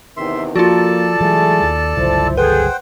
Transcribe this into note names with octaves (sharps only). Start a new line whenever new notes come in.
E2 C3 D#3 E5 C6
F3 A#3 F4 F#4 A4 D5 A5
E3 F#3 G#3 A3 E4 G#4
D#2
G1 C#2 F3 F#3 E4 C5
G#4 A4 B4 C5 F#5 G5